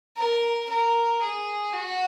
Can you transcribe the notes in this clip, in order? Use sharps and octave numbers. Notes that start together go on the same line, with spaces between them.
A#4
A#4
G#4
F#4